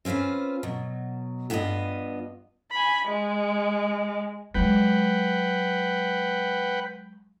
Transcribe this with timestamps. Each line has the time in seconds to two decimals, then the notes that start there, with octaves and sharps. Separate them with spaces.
0.05 C4 C#4 F4 B4 C5
0.63 B2 F#3
1.50 G2 B3 F4 G#4 D#5
2.71 G#5 B5
3.05 G#3
4.55 F#3 G#3 B4 F#5 G5